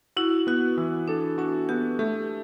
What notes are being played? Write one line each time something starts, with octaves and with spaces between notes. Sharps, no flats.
E4 F#4
B3 F#4
E3 E4
D4 A4
D4 F#4
B3 G4
A3 G4